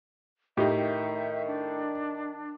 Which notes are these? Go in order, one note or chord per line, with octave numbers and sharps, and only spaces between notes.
A2 D#3 D#4 G4 E5
D4